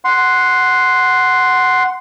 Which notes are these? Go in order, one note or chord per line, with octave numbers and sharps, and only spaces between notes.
F#5 C6